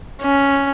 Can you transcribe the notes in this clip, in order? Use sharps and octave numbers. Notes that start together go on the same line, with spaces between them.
C#4